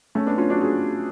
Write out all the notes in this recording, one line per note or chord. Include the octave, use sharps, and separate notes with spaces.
A3 C#4
B3 D4
C#4 F4
D4 F#4
F4 G#4